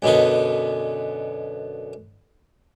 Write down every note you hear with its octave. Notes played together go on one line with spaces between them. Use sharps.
F#2 B2 D3 D#4